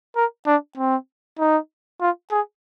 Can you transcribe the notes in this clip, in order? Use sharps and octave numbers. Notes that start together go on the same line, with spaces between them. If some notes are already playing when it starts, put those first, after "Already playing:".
A#4
D4
C4
D#4
F4
G#4